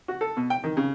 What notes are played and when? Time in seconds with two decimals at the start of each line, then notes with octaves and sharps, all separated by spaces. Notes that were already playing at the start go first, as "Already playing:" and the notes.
0.08 F#4
0.21 A4
0.37 B2
0.50 G5
0.64 D#3
0.77 C#3